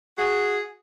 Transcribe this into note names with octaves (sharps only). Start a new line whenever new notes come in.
F#4 G#4